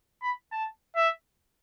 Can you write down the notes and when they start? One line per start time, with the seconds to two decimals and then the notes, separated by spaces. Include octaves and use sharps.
0.22 B5
0.52 A5
0.96 E5